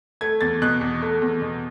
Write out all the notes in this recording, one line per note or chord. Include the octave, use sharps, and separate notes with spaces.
A3 G#6
E2 A6
B2 F#6
E2
A3
E2
B2